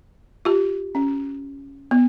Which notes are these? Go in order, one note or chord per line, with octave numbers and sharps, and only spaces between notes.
F4 G4
C#4
B3